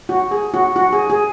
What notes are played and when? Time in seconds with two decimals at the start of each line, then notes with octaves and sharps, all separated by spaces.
0.09 F#4
0.31 G#4
0.54 F#4
0.76 F#4
0.93 G#4
1.10 G#4